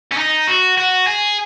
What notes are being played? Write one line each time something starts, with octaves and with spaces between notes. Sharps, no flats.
C#4
D#4
F#4
F#4
G#4